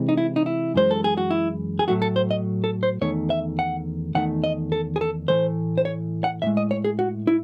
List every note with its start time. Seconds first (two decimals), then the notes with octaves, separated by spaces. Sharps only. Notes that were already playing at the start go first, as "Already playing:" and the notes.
Already playing: C3 E3 G#3
0.09 D#4
0.17 E4
0.36 D#4
0.46 E4
0.74 F#2 E3 G#3 C5
0.91 A4
1.04 G#4
1.18 F#4
1.31 E4
1.79 G#4
1.88 A2 F#3 A3 F#4
2.02 A4
2.16 C5
2.31 D#5
2.64 A4
2.83 C5
3.01 E2 D#3 A3 C#5
3.30 E5
3.59 F#5
4.15 E2 D#3 A3 F#5
4.44 D#5
4.72 A4
4.96 G#4
5.01 A4
5.28 A2 E3 A3 C5
5.78 C5
5.85 C#5
6.24 F#5
6.42 A2 G#3 E5
6.57 D#5
6.71 C#5
6.85 G#4
6.99 F#4
7.27 E4